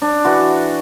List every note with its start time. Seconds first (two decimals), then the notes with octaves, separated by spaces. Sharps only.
0.02 D4
0.25 E3 F#4